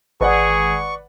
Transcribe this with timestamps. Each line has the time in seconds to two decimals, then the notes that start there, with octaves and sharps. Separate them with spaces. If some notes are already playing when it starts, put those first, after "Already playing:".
0.21 G#1 G#4 B4 D5 F#5 C#6